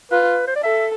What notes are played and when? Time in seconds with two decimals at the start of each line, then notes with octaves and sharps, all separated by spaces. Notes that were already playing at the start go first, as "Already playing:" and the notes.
0.11 F4 B4
0.47 C5
0.56 D5
0.63 A4 E5